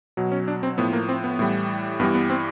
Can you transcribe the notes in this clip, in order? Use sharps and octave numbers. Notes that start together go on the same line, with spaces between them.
B2 F#3
C#4
D4
C4
A2 F3 B3
A#3
C4
B3
A2 E3 G3
G2 E3 G3 B3
B3
C4